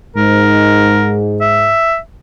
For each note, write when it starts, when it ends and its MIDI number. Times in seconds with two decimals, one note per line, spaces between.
0.17 1.74 44
0.17 1.20 70
1.41 1.98 76